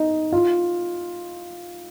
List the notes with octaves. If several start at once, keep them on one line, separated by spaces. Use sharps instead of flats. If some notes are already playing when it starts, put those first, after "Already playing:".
Already playing: D#4
F4